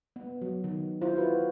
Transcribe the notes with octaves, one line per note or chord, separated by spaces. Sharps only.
B3
F#3
D#3
E4 F4 C5
F#4 B4 E5